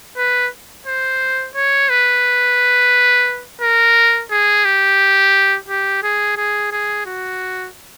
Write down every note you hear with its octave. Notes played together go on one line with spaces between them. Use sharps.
B4
C5
C#5
B4
A#4
G#4
G4
G4
G#4
G#4
G#4
F#4